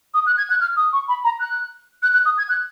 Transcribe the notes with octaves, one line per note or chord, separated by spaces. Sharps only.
D#6
F#6
G#6
F#6
F6
D#6
C#6
B5
A#5
F#6
F#6
F#6
D#6
G#6
F#6